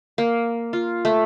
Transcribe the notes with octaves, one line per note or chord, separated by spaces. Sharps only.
A#3
F4
A3